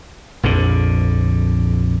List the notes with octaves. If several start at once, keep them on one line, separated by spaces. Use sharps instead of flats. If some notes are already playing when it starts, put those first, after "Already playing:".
A#1 F2 D3